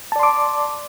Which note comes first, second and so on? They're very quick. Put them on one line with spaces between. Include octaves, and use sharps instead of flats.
A5 D5 C6 D6